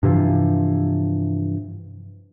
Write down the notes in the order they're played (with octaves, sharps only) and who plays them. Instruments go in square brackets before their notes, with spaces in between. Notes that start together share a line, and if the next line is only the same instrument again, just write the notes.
[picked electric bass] G2 C3 E3 F3